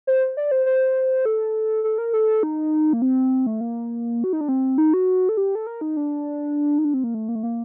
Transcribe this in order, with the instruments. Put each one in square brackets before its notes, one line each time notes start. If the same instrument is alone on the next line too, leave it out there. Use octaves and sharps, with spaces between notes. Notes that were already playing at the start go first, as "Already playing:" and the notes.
[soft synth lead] C5
D5
C5
C5
A4
A4
A#4
A4
D#4
A#3
C4
A3
A#3
F#4
D#4
D4
C4
D#4
F#4
A4
G4
A4
A#4
D#4
D4
D#4
D4
C4
A#3
A3
A#3
A3
A#3